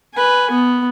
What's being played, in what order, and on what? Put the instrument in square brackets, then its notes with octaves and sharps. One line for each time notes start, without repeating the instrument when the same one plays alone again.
[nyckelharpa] B4 G#5
B3